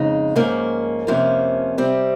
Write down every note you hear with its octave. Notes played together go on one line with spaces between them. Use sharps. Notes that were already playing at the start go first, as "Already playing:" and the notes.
Already playing: F2 C#3 G#3 D#4
G#2 F3 A#3 C#4
F2 C3 F3 A#3 C#4
C3 G3 C4